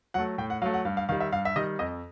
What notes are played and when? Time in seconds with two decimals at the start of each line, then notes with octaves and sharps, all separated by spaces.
0.14 F#3 A3 F#5
0.38 A2 G5
0.50 F#5
0.62 F#3 A3 F5
0.74 F#5
0.85 G2 F5
0.97 F5
1.09 D#3 G3 F5
1.20 E5
1.32 G2 F5
1.45 E5
1.56 D#3 G3 D#5
1.79 F2 D#5